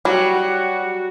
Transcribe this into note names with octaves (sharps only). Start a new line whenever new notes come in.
F#3 G3 F#4